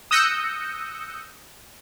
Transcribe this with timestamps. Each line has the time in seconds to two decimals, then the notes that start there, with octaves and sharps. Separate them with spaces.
0.11 D#6 E6 F#6 G6 A#6 C#7